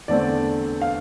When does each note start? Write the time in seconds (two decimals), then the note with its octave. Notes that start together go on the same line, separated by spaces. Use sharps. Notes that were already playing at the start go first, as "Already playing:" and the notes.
0.08 E2 D3 A3 C4 D5
0.82 F5